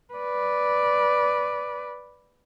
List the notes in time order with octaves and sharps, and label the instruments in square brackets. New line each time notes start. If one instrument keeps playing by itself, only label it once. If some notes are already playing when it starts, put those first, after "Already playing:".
[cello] B4 D5